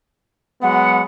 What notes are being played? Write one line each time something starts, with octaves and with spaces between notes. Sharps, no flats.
F#3 G#3 B3 F#5